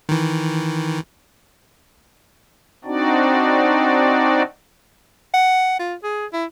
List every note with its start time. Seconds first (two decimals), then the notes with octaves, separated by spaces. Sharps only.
0.09 D#3 E3
2.85 C4 D4 D#4 F#4 D5
5.34 F#5
5.79 F4
6.03 G#4
6.33 E4